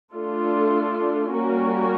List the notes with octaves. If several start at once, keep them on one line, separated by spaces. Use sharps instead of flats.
A3 D4 F4 A4
G3 A#3 C#4 F#4 A#4